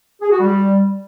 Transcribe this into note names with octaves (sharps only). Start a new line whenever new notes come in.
G#4
F#4
G3